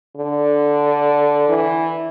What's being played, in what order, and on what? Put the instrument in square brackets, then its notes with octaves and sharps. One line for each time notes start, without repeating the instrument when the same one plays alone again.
[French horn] D3
E3